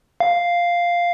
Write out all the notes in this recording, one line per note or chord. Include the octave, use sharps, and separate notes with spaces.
F5